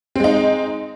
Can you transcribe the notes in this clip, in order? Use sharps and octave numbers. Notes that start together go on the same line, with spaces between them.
G#3 C4 D#4